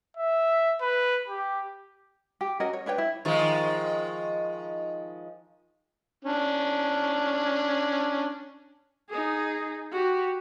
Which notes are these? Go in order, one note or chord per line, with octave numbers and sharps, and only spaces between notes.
E5
B4
G4
G4
C#4 F#4 A#4 D#5
C#5
D4 B4 C#5 G5
E4
D#3 F3 G#3
C#4 D4
D#4 G#4
F#4 G4